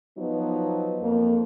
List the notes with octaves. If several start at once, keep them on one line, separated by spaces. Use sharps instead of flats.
F3 F#3 B3 D#4
F2 A#3